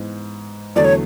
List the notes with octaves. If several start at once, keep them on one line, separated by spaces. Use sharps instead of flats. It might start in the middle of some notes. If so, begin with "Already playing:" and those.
Already playing: G#2 E3 B3
E2 D3 F#3 A3 D5
C#5